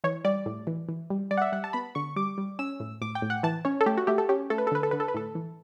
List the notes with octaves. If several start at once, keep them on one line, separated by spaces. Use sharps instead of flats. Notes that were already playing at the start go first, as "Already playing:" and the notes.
E3 C#5
G3 D5
A2
E3
E3
G3
G3 D5
F#5
E5
G3 F#5
A5
B3 B5
D3 C#6
G3 D6
G3
C#4 E6
A2
A2 D6
G5
A2
F#5
E3 A5
C#4 C#5
A4
A3 G4
F#4
A3 G4
A4
C#4 G4
A3 A4
B4
A4
D3 B4
A4
D3 B4
A4
B4
A2 A4
E3